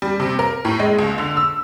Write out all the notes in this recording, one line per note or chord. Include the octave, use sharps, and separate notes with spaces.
G3
C3
A#4
A2
G#3
C#2
D3
E6